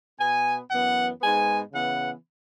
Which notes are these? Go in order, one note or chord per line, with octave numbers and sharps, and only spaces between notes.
B2 B3 G#5
F#2 E3 B3 F#5
G#2 G#3 B3 G#5
C#3 E3 B3 F#5